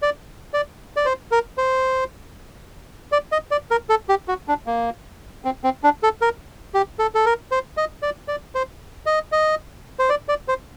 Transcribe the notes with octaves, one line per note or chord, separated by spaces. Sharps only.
D5
D5
D5
C5
A#4
C5
D5
D#5
D5
A#4
A4
G4
F#4
D4
A#3
C4
C4
D4
A4
A#4
G4
A4
A4
A#4
C5
D#5
D5
D5
C5
D#5
D#5
C5
D5
D5
C5